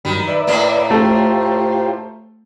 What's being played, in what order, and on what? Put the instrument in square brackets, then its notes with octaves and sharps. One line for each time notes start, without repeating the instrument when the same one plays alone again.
[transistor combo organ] G2 F#3 B5 [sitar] D#3
[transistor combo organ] B4 D5 E5
[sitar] A2 A#3
[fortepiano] A3 [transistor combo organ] F4 G4 C5